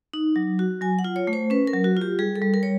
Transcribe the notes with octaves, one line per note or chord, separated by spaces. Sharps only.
D#4
F#3
F#4
F#3 G#5
F#5
F4
C#5
A3
C5
C#4 B4
A#4
F#3
F#4
F4 G4
G3 G#4
A4
G3
A#4
C#5